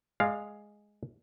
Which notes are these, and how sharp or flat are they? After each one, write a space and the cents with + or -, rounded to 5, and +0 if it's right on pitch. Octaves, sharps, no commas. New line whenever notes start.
G#3 +0 D5 +40 F5 +0